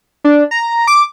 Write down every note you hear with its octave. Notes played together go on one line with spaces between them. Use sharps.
D4
A#5
D6